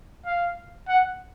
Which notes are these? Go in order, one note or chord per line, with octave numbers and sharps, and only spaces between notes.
F5
F#5